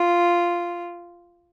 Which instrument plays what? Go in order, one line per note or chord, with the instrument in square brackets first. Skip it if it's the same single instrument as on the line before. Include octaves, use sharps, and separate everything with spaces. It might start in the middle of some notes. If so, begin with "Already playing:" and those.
Already playing: [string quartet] F4